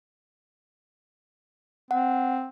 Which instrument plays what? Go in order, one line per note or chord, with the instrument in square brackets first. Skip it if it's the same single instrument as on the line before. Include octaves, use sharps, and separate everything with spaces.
[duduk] C4 [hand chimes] F#5